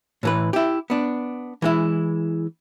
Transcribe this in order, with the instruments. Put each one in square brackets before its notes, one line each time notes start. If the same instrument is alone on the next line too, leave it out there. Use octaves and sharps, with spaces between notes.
[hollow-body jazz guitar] A2 E3 B4
E4 G4
B3 D4
E3 G#3 E4